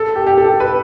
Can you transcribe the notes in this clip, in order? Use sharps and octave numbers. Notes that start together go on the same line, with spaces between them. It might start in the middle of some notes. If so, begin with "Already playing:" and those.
Already playing: A4
G4
G4
A4
B4